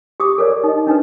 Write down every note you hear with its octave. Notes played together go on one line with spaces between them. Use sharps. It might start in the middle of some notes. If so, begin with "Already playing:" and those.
G4 D6 D#6
A4 A#4 C#5 D5
D#4 D#5
D4 D#4 A4 B4